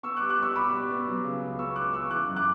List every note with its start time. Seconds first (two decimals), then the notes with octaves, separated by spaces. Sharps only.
0.03 B3 C#6 E6
0.17 D6 F#6
0.21 G3
0.29 D6 F#6
0.38 G3 C#6 E6
0.56 B2 B5 D6
0.73 G3
0.91 B3
1.07 F#3
1.24 C#3
1.42 C#2
1.59 B3 C#6 E6
1.76 C#2 D6 F#6
1.93 C#3 C#6 E6
2.10 E3 D6 F#6
2.28 F#2
2.36 D6 F#6